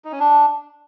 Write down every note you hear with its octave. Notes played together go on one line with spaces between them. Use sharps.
D#4
C#4
D4